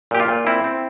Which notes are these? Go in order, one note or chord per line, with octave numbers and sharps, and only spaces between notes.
A#2 G4
F4
A#2
C4 E4
C4